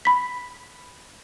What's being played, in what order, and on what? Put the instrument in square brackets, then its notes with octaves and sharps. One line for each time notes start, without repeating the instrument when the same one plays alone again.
[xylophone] B5 B6